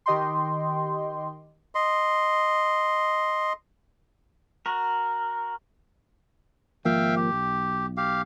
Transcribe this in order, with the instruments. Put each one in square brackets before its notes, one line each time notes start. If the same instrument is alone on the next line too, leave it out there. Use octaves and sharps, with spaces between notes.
[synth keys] D#3 G4 D#5 G5 C6
[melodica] D#5 C6
[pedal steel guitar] F#4 A#4
[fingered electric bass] G#1 F3 A#3 [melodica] E5 F5 G5
[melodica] G4
[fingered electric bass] B1
[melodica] G4 F5